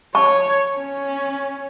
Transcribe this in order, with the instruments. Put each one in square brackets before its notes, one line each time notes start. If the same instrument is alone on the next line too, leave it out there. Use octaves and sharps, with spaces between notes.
[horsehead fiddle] C#5 [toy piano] A5 C#6
[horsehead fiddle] C#4